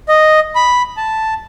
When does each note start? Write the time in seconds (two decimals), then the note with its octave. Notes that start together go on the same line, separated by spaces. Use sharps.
0.09 D#5
0.55 B5
0.97 A5